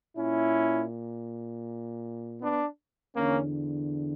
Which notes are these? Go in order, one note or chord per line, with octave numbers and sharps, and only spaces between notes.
A#2 C#4 E4
B3 D4
E2 D3 A#3 C#4